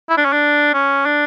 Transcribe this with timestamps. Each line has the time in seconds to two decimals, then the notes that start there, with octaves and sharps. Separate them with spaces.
0.10 E4
0.17 D4
0.25 C#4
0.33 D4
0.74 C#4
1.06 D4